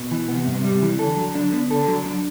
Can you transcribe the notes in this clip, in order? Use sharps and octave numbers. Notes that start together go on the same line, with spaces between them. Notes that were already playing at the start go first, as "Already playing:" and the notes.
Already playing: B2
E3
C3 B3
G2
G3
E3
D3 A4
F#3
D4
B3
D3 A4
F#3
D4